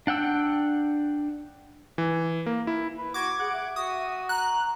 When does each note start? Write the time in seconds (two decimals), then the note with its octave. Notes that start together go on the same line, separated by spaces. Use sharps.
0.07 D4 F#5 G5 E6
1.98 E3
2.46 A#3
2.67 E4
2.97 B4
3.14 F#4 D6 G#6
3.39 G#4 F#5
3.53 E5
3.76 F#4 D#6
4.29 A#5 F#6